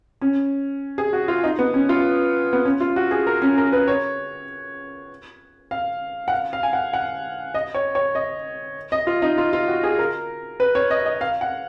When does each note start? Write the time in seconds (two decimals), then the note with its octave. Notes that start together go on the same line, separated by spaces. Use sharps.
0.21 C#4
0.98 G#4
1.13 F#4
1.28 F4
1.44 D#4
1.59 B3
1.74 C#4
1.89 F4
2.53 B3
2.65 C#4
2.81 F4
2.96 F#4
3.11 G#4
3.27 A#4
3.42 C#4
3.57 A#4
3.72 B4
3.88 C#5
5.71 F5
6.28 F#5
6.32 F5
6.53 F5
6.63 G#5
6.73 F#5
6.93 F#5
7.54 D#5
7.74 C#5
7.95 C#5
8.15 D#5
8.92 D#5
9.07 F4
9.22 D#4
9.38 F4
9.53 F4
9.68 F#4
9.83 G#4
9.99 A#4
10.60 B4
10.75 C#5
10.91 D#5
11.06 D#5
11.21 F5
11.41 F#5